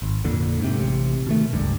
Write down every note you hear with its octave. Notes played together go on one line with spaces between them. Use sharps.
G#1
F2 A#2 D3
G#2 C3
A1 C3
B2 D#3 A3
G1 C#2 G2